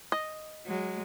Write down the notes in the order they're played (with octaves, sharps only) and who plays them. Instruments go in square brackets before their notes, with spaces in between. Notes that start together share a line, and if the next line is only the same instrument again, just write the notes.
[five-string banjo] D#5
[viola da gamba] F#3 G#3